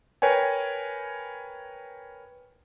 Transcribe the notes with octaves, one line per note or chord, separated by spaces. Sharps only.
A#4 B4 C#5 G5 G#5